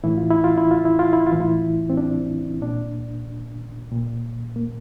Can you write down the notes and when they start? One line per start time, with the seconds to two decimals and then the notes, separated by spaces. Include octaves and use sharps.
0.03 A2 E3 E4
0.17 F4
0.31 E4
0.44 F4
0.58 E4
0.71 F4
0.85 E4
0.99 F4
1.13 E4
1.26 F4
1.33 A2 E3
1.40 E4
1.90 C4
1.97 D4
2.62 A#2 D4
3.92 A#2
4.56 A#3